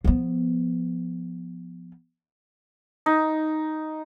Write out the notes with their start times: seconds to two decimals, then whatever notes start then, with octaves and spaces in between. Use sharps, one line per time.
0.04 F3 B3
3.06 D#4